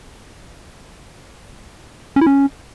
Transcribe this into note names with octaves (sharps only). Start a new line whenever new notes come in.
C#4
E4
C#4